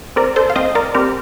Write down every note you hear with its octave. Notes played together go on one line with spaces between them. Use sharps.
C4 A#4 D5
A4 C5
F5
C4 C5 D#5
A#4 D5
C4 G4 A#4